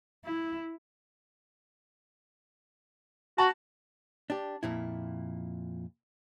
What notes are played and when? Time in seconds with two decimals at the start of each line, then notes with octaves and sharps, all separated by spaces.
0.25 E4
3.38 F#4 A5
4.30 D4 G4
4.63 F2 A#2 E4